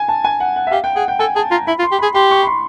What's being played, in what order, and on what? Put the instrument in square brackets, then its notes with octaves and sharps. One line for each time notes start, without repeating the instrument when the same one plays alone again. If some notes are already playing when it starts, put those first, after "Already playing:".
Already playing: [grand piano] G#5
A5
G#5
F#5
F#5
E5
[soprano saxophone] G4 [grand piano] F5
[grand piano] G5
[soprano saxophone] G#4 [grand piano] F#5
[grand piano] G5
[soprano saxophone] A4 [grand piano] G#5
[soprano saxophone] G#4 [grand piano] A5
[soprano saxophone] F4 [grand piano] A#5
[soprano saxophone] E4 [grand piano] B5
[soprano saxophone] F4
[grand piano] C6
[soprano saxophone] G4
[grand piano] B5
[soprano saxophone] G#4
[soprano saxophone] G4 [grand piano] C6
[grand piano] C#6
B5
C6